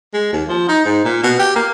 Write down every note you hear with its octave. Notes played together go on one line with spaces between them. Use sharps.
G#3
D#2
F3
D#4
G#2
A#2
B2
G4
A#3